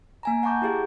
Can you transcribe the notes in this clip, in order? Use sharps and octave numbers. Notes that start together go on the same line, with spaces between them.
A#3 G#5 A#5
F#5 A5 A#5 C#6 D6 G6
E4 G4 G#4 F5